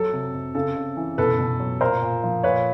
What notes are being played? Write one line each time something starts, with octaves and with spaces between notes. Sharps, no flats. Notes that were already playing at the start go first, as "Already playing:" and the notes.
Already playing: F#3 A4
C3
C3
C#3 A4
C#3
E3
B2 A4 B4
B2
F#3
A#2 A#4 C5
A#2
F3
A#2 B4 C#5